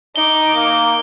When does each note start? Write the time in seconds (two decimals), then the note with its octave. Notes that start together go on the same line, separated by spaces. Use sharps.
0.16 D#4 D6 G7
0.56 A#3